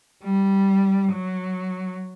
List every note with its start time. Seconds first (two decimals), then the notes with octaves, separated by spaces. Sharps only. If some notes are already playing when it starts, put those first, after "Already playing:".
0.24 G3
1.13 F#3